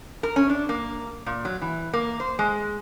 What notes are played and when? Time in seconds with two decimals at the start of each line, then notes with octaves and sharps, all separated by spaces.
0.23 A#4
0.36 C#4
0.49 D4
0.69 A#3
1.26 A#2
1.45 F#3
1.61 E3
1.93 A#3
2.20 C5
2.39 G#3